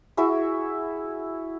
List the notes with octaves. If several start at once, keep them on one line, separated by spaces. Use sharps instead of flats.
E4 F#4 G#4 E5